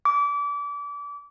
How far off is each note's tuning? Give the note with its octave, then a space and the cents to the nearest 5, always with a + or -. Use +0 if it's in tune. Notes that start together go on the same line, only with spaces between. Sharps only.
D6 -30